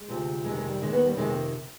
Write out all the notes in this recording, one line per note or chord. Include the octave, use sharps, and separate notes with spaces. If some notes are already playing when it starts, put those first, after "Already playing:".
Already playing: G#3
D2 C3 F3
F2 C3 D#3 G#3
G#3
G3
D#2 D#3 G#3
B3
G3
F2 C3 D#3 G#3
C4